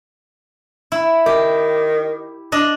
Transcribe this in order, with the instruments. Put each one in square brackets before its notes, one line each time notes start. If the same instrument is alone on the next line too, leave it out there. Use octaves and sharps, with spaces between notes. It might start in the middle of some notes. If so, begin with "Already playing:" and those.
[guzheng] E4
[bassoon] D#3 [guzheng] G4
[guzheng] D4 D#5